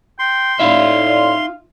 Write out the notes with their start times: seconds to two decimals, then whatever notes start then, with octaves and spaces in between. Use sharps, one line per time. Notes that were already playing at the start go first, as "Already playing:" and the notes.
0.19 G5 C6
0.60 A2 D#4 F4 D5 E5 F5